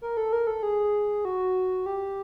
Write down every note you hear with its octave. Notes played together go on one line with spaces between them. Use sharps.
A#4
A4
A#4
A4
G#4
F#4
G4